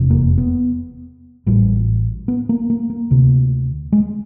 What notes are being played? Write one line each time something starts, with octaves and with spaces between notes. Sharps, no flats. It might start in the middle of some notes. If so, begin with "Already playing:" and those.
Already playing: F1 E2 C3
A#3
B3
A1 A2 G3
B3
A#3
A#3
A#3
D2 C3
G#3